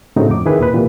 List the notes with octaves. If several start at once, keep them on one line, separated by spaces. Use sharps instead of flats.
A2 C#3 A3 C4 D#4 F#4
F2 D6
D#3 E4 G#4 B4
D#2 A#2 B4
A#2 E3 G3